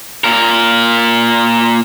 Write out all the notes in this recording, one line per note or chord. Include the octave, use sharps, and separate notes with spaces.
A#2 A#4